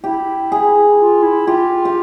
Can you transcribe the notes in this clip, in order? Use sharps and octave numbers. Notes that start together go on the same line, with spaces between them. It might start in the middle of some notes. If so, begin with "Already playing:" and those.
E4 G4
G#4
F4
E4
F4 G4
G4